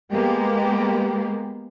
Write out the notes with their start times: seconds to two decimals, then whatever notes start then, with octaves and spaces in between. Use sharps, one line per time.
0.11 G#3 A#3 B3 G4